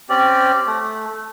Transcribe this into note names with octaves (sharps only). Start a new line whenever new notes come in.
C4 C#4 G4 D5
A3